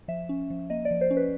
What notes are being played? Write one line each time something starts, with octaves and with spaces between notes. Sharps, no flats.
F3 E5
C#4
F3
A#3 D#5
D5
F3
C5
C#4
B4